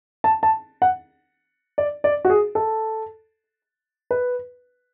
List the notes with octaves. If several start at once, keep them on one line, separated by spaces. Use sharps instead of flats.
A5
A5
F#5
D5
D5
F#4
G#4
A4
B4